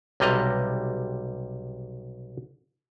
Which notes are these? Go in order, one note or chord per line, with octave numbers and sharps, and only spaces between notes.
B1 C3 G3 D#5 A#5